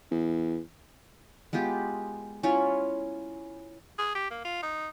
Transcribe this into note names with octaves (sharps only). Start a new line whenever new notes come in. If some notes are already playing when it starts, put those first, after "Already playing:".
E2
G#3 B3 F4 G4
C#4 E4 F4 C#5
G#4
G4
A#3
F4
D#4